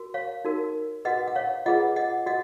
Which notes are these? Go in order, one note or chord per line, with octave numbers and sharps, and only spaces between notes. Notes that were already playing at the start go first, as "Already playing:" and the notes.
Already playing: F#4 A#4
C#5 F5
D#4 F#4 A#4
F#4 B4 D#5 F#5
F#5
C#5 F5
F4 G#4 B4 D#5 F#5
D#5 F#5
F#4 D#5 F#5